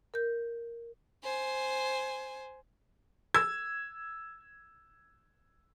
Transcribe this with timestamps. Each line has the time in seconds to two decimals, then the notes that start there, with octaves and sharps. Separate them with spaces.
0.14 A#4 G6
1.23 C5 G#5
3.34 E6 G#6